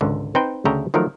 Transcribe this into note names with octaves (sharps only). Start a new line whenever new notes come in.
G#1 C#2 D3
C4 D#4 B4 C5 G5
D2 C#3 A4 E5 G5 A#5
D#3 F3 F#3 A3 A#4